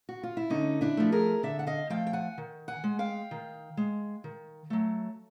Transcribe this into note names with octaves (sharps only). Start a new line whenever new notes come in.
F#4
F4
E4
D3 C#4 D#4
D4 E4
F3 A3
G#4 A#4
D3 D5 E5
F#5
D#5 F5
F3 A3 F5 G5
G5
F#5 G#5
D#3
F#5 G#5
G#3
F5 G5
D#3
G#3
D#3
F#3 A3